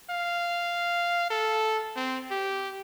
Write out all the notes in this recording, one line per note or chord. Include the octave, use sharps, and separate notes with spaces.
F5
A4
C4
G4